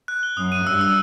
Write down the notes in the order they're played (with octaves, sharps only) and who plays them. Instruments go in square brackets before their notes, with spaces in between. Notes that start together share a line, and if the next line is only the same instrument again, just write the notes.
[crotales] F#6
G7
[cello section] F#2 [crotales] D#6
[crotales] D#7
[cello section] G2 [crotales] E6
[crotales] E6